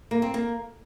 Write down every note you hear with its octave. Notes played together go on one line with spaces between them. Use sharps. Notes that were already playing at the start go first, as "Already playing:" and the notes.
A#3
C4
A#3